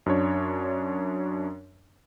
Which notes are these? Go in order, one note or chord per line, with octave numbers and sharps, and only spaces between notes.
F#2 D4 C#5